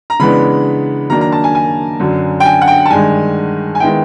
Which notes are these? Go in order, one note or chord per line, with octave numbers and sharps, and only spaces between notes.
A#5
C#3 E3 G#3 B3 D4 B5
D#3 F#3 A#3 D4 A#5
A#5
A5
G#5
G#5
F#2 D3 F#3
G5
G#5
F#5
G5
A5
G2 D#3 G#3 G#5
G#5
D#3 G#3 B3 E4 G5